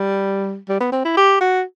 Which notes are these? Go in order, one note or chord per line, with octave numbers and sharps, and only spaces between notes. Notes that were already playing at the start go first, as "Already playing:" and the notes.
Already playing: G3
G3
B3
C4
E4
G4
F#4